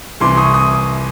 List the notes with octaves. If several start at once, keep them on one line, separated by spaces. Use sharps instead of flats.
C2 C3 E3 C6 D6
C#6 D#6
C#6 D#6